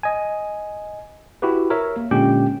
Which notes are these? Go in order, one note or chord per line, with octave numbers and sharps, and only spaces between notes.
D#5 G#5
E4 F#4 G4 B4
A#4 C#5 E5
A#3
A#2 D3 G#3 C#4 G4 G5